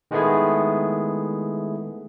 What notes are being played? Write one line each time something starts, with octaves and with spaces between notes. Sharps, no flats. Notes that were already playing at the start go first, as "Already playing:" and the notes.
D#3 G#3 A3 B3 E4 G#4